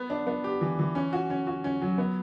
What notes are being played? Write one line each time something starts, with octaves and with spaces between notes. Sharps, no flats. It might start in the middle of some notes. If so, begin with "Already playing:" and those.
Already playing: B3
D4
B3
G4
E3
E3
C#4
F#4
C#4
F#4
C#4
F#3
B3